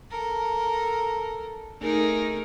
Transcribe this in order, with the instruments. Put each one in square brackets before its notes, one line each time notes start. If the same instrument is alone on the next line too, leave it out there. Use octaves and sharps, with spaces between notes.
[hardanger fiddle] A4 A#4
[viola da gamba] A3 D#4 A#4 [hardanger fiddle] G#4